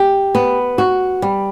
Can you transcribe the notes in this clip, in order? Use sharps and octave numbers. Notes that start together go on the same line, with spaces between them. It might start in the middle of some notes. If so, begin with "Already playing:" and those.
Already playing: G4
B3
F#4
G3